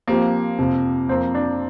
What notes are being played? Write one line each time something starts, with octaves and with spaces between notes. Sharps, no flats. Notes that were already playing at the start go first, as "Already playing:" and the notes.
F3 A#3 C4 G4
F2 C3 F3
F2 F3 A#3 C4
D4